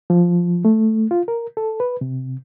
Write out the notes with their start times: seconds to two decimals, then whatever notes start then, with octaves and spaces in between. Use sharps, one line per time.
0.10 F3
0.65 A3
1.11 F4
1.28 A#4
1.57 A4
1.80 B4
2.01 C3